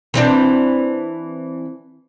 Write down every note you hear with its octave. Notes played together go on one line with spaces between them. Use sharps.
E3 C4 D4